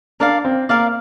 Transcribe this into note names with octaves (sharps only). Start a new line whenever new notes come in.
D4 A#4 D5 F5
C4
A#3 A#4 D5 F5